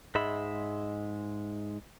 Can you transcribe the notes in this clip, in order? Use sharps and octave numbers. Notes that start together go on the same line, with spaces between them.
G#2 G#3 E5 B5